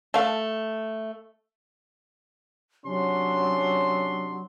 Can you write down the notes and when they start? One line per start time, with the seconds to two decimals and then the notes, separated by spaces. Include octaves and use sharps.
0.14 A3 F5
2.86 C3 F#3 C#4 D4 C6